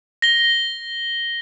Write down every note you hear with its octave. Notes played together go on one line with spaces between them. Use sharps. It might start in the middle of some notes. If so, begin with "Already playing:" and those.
A#6 G7